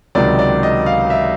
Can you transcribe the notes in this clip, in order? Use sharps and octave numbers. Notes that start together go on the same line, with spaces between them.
C#2 C3 D#3 F#3 D5
D5
D#5
F5
E5